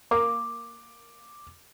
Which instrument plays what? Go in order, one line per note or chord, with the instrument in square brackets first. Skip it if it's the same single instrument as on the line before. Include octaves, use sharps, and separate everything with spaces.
[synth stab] A#3 [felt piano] D6